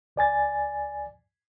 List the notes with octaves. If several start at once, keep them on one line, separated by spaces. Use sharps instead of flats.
C#2 D5 G#5 A6